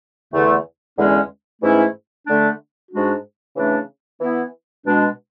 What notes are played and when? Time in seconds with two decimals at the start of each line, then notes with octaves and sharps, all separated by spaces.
0.33 E2 D3 A3
0.97 E2 D3 G#3 C#4
1.62 G#2 E3 A3 C#4 E4
2.27 D3 A3 D4
2.91 G#2 G#3 D4 F#4
3.56 C#3 E3 A3 D4
4.21 E3 B3 E4
4.85 B2 G#3 D4